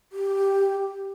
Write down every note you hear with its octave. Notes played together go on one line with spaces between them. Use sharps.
G4